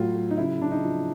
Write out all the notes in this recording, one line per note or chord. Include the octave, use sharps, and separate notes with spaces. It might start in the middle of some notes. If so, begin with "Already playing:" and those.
Already playing: A2 F#3 F4
F#3
D#4
C#3 E4
C#3 D4
D#4
F3